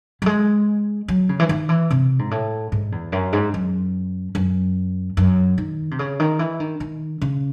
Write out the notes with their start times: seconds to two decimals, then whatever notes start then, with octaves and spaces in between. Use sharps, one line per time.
0.22 F#3
0.26 G#3
1.08 F#3
1.29 C#3
1.40 E3
1.49 D#3
1.69 E3
1.90 C3
2.19 G#2
2.31 A2
2.72 G#2
2.92 E2
3.12 F#2
3.33 G#2
3.54 F#2
4.35 F#2
5.17 F#2
5.58 D#3
5.91 C3
5.99 C#3
6.20 D#3
6.39 E3
6.60 D#3
6.80 D#3
7.21 C#3